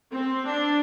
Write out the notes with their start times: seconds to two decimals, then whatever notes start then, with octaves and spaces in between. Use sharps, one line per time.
0.12 C4
0.45 D4